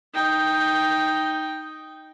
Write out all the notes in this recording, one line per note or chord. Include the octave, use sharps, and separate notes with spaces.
D#4 G5